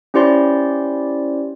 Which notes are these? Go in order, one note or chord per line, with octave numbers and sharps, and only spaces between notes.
C#4 E4 G4 C5 D5 C6